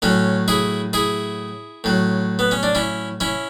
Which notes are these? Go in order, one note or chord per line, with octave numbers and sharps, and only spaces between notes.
A2 F#3 C#4
E4 G#4
E4 G#4
A2 F#3
B3
C#4
D4
C#4 E4
C#4 E4